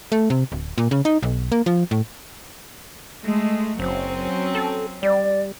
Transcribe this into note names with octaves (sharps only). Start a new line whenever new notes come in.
A3
C3
D1
A#2
C#3
D#4
B1
A#3
F3
A2
G#3 A3
F#1 F#3 C4 C#4
A4
G3 D5